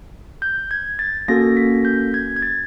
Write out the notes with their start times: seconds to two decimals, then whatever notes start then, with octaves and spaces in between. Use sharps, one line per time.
0.42 G6
0.71 G#6
0.99 A6
1.28 A#3 C#4 F#4 A4 A#6
1.57 B6
1.85 G6
2.14 G#6
2.36 G#6
2.42 A6